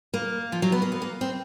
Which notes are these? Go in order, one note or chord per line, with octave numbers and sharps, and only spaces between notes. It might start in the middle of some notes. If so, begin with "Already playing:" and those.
A#3
F3
F#3
B3
A#3
B3
A#3
C4